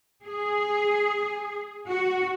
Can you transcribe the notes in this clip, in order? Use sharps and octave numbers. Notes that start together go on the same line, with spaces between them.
G#4
F#4